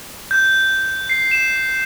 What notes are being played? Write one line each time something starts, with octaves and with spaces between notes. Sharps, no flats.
G6
C7
E7